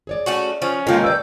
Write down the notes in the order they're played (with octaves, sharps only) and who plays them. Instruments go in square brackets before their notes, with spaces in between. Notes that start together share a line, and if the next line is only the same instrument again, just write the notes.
[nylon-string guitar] G#4 C#5 D5
[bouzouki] A3 C#4 F#4
[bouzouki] F3 [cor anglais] C#4
[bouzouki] C3 D#3 [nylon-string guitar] G#3 A#3 A4 [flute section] F4 D#5
[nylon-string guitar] B4 D5 [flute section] E6 G6